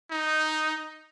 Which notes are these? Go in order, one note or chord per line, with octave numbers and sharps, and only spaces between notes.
D#4